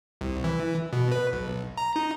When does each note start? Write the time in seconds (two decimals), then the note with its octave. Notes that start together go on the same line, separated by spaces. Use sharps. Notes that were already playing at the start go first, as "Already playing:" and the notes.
0.21 C2
0.44 E3
0.93 B2
1.12 B4
1.33 B1
1.77 A#5
1.96 D#4